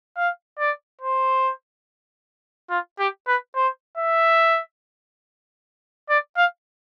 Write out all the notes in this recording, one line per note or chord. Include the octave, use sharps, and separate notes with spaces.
F5
D5
C5
F4
G4
B4
C5
E5
D5
F5